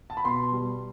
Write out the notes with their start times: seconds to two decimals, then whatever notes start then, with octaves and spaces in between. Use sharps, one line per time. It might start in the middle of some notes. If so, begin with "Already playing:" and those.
0.10 A5
0.17 B5
0.24 B2 C6
0.52 G3